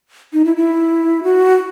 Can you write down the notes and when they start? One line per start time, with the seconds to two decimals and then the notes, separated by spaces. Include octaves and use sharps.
0.33 D#4
0.45 E4
0.57 E4
1.24 F#4